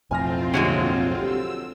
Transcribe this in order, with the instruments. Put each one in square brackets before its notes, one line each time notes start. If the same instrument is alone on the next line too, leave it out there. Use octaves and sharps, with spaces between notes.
[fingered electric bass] B1 F2 A2 [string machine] C4 F4 [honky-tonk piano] G#5 F6 A#6
[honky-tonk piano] D#2 E5 [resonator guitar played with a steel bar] D3 F#3 G#3
[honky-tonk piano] G3 [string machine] E6